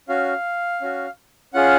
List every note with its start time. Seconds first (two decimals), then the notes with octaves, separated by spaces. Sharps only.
0.09 C#4 F#4 F5
0.81 C#4 F#4
1.54 C#4 F4 G#4 F#5